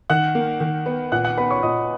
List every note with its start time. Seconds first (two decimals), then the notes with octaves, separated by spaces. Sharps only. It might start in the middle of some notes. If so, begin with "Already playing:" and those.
0.10 D#3 F#5 F#6
0.35 A#3
0.60 D#3
0.86 B3
1.12 A#2 F#5 F#6
1.25 F#5 F#6
1.37 B3 B4 B5
1.50 C#5 C#6
1.63 A#2 D#5 D#6